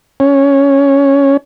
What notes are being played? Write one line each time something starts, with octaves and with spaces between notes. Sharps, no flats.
C#4